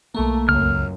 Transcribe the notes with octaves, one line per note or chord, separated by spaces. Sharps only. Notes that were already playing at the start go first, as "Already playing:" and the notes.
B1 A3 A#3
C#2 F#2 F6